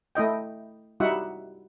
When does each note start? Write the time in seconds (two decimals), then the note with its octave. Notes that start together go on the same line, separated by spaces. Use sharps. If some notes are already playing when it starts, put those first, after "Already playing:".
0.15 A3 E4 D#5 G5
1.00 G3 D#4 E4 F#4 E5 F#5